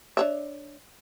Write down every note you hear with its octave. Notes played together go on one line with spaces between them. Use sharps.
D4 C#5 E5